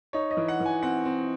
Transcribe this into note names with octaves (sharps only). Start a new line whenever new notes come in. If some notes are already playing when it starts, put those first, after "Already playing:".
D#4 C#5
D#5
E3
F#5
E3
G#5
C4 F#5
C4